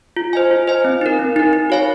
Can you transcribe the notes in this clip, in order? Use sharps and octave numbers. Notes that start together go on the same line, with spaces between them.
F4
C5 D#5 G#5
F4
C5 D#5 G#5
C4
D#4 A#4
C4
D#4 A#4
D#4
F#4 C#5 F5 G#5